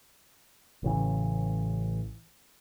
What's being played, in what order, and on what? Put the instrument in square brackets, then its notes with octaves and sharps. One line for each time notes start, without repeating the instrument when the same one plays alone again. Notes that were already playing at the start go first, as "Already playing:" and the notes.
[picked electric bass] A1 C#3 E3